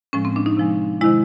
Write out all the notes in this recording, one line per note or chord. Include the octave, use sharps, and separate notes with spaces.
A2 F3 G#3 C#4
C4
D4
D#4
C3 F3 G#3
C3 D#3 G#3 E4